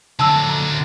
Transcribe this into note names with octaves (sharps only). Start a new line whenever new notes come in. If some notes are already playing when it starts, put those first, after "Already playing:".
D3 F#3 A5 E6
A#5